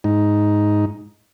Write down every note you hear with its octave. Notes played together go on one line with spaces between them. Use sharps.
G#2 D#4